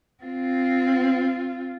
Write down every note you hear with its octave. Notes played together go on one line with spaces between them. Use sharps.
C4 F4